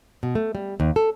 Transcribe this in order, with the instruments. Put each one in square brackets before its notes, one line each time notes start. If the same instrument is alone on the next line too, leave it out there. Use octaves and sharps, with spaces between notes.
[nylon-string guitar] B2
A3
G3
D#2
A4